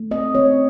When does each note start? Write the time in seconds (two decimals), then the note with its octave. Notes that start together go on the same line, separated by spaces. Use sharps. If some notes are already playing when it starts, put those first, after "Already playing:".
Already playing: A3
0.11 C4 D#5
0.35 C4 C#5